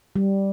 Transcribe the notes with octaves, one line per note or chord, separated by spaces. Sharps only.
G3